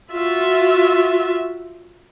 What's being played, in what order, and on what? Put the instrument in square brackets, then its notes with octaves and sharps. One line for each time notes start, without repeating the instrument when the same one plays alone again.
[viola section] F4 F#4 E5